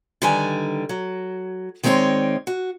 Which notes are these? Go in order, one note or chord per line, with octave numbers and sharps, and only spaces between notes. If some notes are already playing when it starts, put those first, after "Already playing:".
D3 D#3 G3 B4 G#5
F#3
D#3 G#3 C4 C#4 C#5 D5
F#4